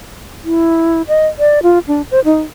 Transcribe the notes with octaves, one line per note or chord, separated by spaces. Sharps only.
E4
D#5
D5
F4
D4
C5
D#4